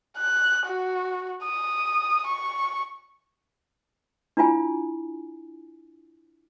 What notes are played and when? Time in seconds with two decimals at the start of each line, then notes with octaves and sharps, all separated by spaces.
0.18 F#6
0.66 F#4
1.44 D#6
2.27 C#6
4.37 D4 E4 F4 G#5